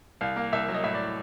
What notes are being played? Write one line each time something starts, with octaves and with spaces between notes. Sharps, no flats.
C2 F5
A#3 F5
C2 E5
F#3
D#5
A2 E5
D5